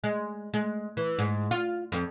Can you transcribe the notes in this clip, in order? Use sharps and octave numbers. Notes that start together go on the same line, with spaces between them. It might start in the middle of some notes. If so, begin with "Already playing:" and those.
G#3
G#3
E3
G#2
F4
F2